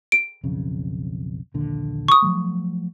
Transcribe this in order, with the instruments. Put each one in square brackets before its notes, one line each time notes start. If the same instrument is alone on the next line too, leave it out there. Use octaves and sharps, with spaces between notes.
[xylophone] D7
[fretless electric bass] B1 F2 C#3
A#1 D#2 D3
[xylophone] C#6 D#6
[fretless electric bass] F3 F#3 A3